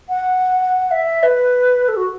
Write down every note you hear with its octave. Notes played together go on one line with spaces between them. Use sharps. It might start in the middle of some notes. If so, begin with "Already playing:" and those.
F#5
E5
B4
A4
F#4